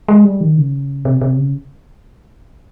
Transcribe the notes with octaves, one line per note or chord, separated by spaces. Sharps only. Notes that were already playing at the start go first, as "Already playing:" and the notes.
G#3
G3
D#3
C#3
C3
C3
C#3